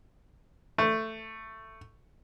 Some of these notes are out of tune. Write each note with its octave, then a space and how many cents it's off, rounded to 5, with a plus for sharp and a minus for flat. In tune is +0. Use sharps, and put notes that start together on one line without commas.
A3 +10